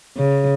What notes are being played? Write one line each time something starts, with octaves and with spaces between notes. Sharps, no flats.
C#3